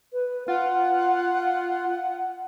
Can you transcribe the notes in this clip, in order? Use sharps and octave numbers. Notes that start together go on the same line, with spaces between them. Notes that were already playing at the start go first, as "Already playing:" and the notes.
B4
F4 F#5